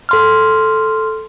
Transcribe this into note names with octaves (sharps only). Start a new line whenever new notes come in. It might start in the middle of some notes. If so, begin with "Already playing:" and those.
A4 C6 F6